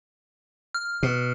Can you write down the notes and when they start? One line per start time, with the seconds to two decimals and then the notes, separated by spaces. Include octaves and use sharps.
0.75 F6
1.03 B2